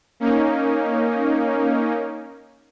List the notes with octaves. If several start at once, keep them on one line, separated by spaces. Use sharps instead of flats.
A#3 C#4 D#4